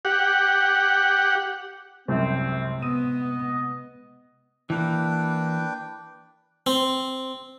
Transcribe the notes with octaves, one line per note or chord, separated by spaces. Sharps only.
G4 F#5
C2 F#2 C3 G3 G#3 C4
B3 D#5 D#7
E3 A#3 D4 B4 G5
C4